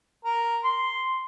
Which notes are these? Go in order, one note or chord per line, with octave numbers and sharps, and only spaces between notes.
A#4
C6